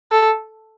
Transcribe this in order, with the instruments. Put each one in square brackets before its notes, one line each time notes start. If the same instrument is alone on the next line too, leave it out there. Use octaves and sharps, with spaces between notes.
[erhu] A4